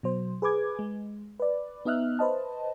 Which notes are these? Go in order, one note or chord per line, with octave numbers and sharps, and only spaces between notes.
B2 F#3 C5
G#4 B4 G#5 D6 G#6
G#3
B4 D5
B3 D#4 D#5 E5 F6 F#6
B4 C5 D#5 A5